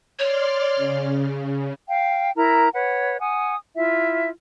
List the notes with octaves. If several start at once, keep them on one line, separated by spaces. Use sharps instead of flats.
C#5 D5 C6 F6
C#3
F5 G5
E4 A#4 A#5
B4 C#5 F#5
F#5 G#5 D#6
E4 F4 E5